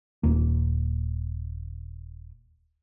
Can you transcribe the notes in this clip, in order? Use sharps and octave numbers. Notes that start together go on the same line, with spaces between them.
D#1 A#3